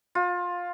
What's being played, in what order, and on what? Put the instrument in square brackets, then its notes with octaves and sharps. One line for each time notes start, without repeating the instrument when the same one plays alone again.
[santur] F4